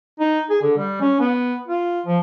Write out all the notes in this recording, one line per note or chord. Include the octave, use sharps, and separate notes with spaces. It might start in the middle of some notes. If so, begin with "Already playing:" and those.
D#4
G#4
D3
G3
C#4
B3
F4
F3